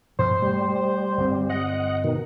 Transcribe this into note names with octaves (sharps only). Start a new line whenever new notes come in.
G2 B2 F3 C5
G3 A3
G1 C4
D#5 F#5
B2 D#3